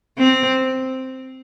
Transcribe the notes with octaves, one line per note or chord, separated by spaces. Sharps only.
C4